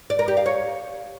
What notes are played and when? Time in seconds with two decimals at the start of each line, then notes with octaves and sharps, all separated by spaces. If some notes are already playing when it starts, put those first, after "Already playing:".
0.10 D5
0.19 A#4
0.28 G4
0.37 F5
0.46 C#5